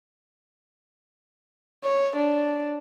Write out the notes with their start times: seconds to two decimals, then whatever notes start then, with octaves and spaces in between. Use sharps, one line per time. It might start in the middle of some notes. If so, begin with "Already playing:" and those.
1.84 C#5
2.17 D4